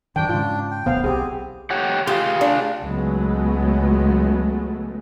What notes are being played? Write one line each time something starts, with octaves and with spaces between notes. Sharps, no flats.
F#2 D#3 D4 G5
G#2 C#3 F4
G5
D1 D2 B2 B3 C5 F5
B1 C4 G4 G#4
G4 C#5 F#5
F4 G4 G#4 F5
D4
C#2 F#3 G#3 A3 B3